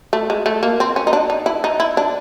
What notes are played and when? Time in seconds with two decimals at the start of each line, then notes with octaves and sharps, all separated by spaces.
0.13 A3
0.30 G#3
0.46 A3
0.63 A#3
0.80 C4
0.96 C#4
1.07 D#4
1.13 D4
1.30 D#4
1.46 E4
1.64 D#4
1.80 E4
1.97 D4